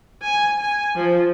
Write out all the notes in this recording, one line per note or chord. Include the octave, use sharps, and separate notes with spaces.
G#5
G#5
F3